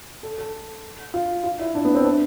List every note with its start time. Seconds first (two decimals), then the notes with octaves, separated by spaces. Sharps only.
0.23 A4
0.38 A4
1.14 F4
1.44 F4
1.59 E4
1.75 D4
1.85 B3
1.95 C4
2.05 D4